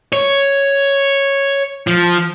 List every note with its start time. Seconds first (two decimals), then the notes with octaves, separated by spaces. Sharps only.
0.13 C#5
1.87 F3